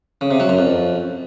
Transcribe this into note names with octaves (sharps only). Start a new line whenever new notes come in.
C#3
C3
F#3
F#2
F2